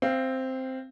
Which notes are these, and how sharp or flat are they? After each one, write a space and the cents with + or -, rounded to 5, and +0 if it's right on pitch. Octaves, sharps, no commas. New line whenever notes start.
C4 +0 F5 -25